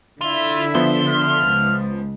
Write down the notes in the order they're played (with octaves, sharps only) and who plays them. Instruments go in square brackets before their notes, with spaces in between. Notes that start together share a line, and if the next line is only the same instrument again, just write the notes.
[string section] D3 E5 [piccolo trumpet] E4 [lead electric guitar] F4
[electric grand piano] F3 B3 [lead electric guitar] C6
[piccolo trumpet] F6
[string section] C#2